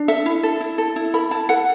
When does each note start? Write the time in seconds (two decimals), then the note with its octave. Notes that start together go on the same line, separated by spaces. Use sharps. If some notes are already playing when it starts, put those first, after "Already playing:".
Already playing: D4
0.08 A4 E5
0.26 E4
0.43 A4
0.60 E4
0.78 A4
0.96 E4
1.14 A4 B5
1.31 E4 A5
1.49 A4 F#5